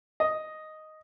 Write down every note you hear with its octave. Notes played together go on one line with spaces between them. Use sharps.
D#5